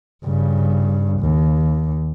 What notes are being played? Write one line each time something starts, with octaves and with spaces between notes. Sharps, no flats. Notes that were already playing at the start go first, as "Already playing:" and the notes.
G2 C#3
D#2